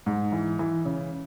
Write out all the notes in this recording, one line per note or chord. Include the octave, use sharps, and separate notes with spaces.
G#2
E3
E3
C#3